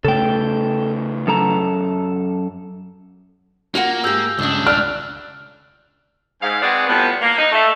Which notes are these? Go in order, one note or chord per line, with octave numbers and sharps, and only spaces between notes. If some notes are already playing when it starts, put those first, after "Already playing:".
C#3 A3 A4 G5
F#2 A4 A#5
A#3 F4 F#4 F#5
G#2 G4 E6 G6
C#2 G2 C#3 D4
D5 F6 F#6 F7
G#2 F5
G#3 C4 F#4 G#4 B4 D5
A2 F3 G3 B3
A#3
D#4
A3